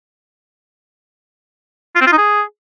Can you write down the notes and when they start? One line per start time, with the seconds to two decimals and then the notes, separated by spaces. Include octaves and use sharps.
1.96 F4
2.01 C4
2.07 F4
2.12 D#4
2.18 G#4